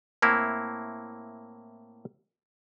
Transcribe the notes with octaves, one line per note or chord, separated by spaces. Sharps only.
A2 A#3 C4 E4